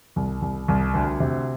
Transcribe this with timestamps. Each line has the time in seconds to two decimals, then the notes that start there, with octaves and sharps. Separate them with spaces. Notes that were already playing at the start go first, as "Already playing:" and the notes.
0.16 C2
0.42 C2
0.68 C2
0.94 D2
1.20 C3